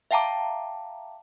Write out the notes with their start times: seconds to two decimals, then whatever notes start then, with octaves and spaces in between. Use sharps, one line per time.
0.11 E5 F5 G5 A5 A#5 D6